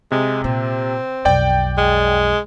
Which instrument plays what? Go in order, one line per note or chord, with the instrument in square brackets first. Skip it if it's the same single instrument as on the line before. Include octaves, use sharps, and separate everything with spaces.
[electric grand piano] C3 [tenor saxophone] G#3
[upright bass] A#2 [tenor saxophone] C4
[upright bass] B1 F2 [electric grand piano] D5 G5
[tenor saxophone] G#3